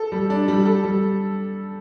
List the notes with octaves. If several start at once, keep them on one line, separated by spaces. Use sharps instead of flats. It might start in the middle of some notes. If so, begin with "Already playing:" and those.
Already playing: A4
G3
D4
G3
A4
G3